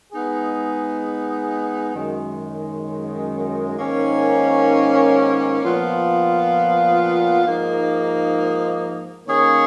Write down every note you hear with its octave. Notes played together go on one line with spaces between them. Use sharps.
G#3 B3 D#4 G#4
F#2 D#3 G#3
G#2 D#3 A#3 C#4
A#2 F3 B3 F4
G#2 F3 A#3 D#4
D#3 A#3 C#4 G#4 C#5